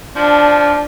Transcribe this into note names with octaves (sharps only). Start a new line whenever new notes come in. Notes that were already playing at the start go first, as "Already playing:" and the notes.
F3 D4